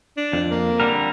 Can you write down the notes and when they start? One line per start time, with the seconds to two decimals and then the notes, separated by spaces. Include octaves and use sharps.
0.17 D4
0.33 F2
0.50 A#3
0.80 D3 G3 A#4